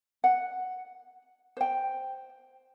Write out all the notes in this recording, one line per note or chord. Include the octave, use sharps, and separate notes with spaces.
F#5
C5 G5